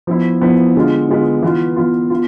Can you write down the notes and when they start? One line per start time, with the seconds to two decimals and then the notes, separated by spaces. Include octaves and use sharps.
0.07 F3 B3 E4
0.41 F3 B3 E4
0.76 D3 G#3 B3 F4
1.09 D3 G#3 B3 F4
1.42 E3 B3 F4
1.76 E3 B3 F4
2.10 B3 F4